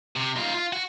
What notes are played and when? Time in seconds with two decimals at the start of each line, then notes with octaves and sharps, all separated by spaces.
0.16 C3
0.36 D#2 F4
0.54 F4
0.73 F#4